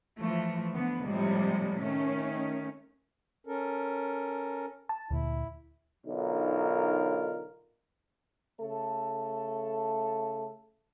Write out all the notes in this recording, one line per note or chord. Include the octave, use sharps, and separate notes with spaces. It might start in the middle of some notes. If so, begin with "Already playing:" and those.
E3 F3 A3
D3 B3
A2 C3 F3 G3 G#3
D#3 A3 C#4
C#4 A4 A#4
A5
D2 A#2 E4
B1 D3 D#4 F4 A#4
C#3 A3 A4